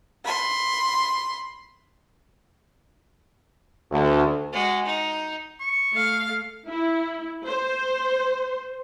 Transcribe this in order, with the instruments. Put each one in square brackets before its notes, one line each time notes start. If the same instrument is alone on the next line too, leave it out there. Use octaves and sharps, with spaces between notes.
[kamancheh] B5 C6
[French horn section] D2
[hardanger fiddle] G#3 F#4
D#4
[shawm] C#6
[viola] A3 F5
[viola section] E4
C5